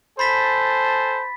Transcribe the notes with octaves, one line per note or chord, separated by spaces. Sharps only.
A4 C5 G#5 A5 B5 A6 B6